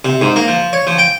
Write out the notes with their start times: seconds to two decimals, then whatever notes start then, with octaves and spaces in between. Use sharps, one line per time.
0.05 C3
0.21 G#2
0.36 A#3
0.48 F3
0.73 C#5
0.87 F3
0.98 G5